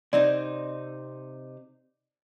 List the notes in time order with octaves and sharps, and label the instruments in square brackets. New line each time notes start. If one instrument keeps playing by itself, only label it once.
[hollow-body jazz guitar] C3 C4 D#4 [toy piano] D5